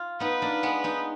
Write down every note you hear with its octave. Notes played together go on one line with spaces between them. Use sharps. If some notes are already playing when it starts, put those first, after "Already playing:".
Already playing: F4
B3 D#4 B4
A#3 D4
G#3 B3
B3 D#4